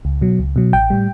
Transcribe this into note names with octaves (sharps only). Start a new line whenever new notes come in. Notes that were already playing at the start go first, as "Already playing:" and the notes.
C#2
B2 F#3
C#2
B2 F#3
A1 G5
A2 G3